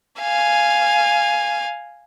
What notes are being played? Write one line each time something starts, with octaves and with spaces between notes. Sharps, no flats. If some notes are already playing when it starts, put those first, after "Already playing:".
F5 G#5